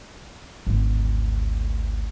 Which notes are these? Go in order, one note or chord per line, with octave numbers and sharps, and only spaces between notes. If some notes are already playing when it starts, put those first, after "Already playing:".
G#1 D2